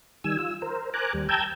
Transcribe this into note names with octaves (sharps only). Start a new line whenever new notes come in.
D#3 G3 G#5 E6
F4 E6
A#4 C5
A#4 C5 G#5 A#5 D6 F#6
D#2 G3
G5 A5 A#5 E6 G6 G#6